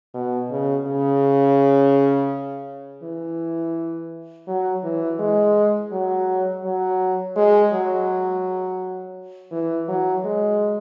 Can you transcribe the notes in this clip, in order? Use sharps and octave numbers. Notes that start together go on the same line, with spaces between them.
B2
C#3
C#3
E3
F#3
E3
G#3
F#3
F#3
G#3
F#3
E3
F#3
G#3